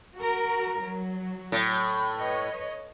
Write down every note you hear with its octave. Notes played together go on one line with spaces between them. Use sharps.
F#4 A#4
F#3
A2
B4 C#5 D#5